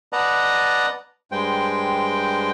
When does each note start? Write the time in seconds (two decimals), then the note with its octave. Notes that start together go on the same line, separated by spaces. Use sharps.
0.13 B4 D5 D#5 F#5 A5 A#5
1.32 G2 G#3 C5 G5